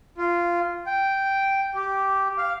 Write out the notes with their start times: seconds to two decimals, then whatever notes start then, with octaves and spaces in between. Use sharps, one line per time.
0.18 F4
0.86 G5
1.75 G4
2.38 F5